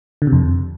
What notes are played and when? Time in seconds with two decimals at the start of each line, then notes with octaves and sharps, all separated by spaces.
0.22 D3
0.27 C3
0.33 F2